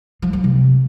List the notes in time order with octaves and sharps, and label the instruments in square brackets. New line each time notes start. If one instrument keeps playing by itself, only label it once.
[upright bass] F3
F#3
C3